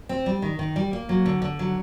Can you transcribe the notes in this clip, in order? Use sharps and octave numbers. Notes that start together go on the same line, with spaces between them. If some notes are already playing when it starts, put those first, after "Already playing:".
C4
G3
D#3
D#3
G3
A#3
F#3
D3
D3
F#3